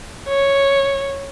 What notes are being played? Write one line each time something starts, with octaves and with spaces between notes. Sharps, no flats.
C#5